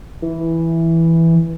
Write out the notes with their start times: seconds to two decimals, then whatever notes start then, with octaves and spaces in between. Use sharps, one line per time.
0.22 E3